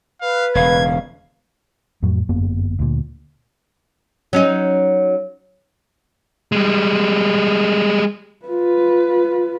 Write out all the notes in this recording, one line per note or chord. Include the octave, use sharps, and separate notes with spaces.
B4 F5
E1 C#3 F5 G#6
F2 A2 F#3
G1 F#2 A#3 B3
D2 A#2
F#3 C#4 D#4
G3 G#3
F4 B4